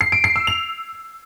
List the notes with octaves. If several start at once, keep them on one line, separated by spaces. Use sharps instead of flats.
C7
D7
C7
E6
F7